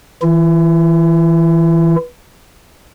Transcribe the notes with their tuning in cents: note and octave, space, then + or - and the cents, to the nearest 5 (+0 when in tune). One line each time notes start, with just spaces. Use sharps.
E3 -15 E4 +40